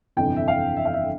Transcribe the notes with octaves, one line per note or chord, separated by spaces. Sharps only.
G1 F2 C3 E3 G5
E5
F5
E5
F5
E5